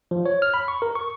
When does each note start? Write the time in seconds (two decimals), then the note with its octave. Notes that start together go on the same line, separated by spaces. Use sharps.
0.11 F3
0.26 C#5
0.42 F6
0.54 B5
0.68 C#6
0.82 A#4
0.95 C#6